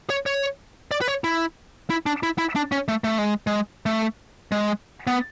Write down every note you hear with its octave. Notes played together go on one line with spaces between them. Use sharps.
C#5
C#5
D5
B4
C#5
E4
E4
D4
E4
E4
D4
C#4
A3
A3
G#3
G#3
A3
G#3
B3